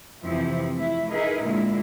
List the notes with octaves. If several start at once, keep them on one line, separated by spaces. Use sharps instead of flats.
F2 C3 E3 F3 C4 E4
A3 E4
D#4 E4 G#4 A#4 B4 D#5
A#2 D3 G#3 A#3 E4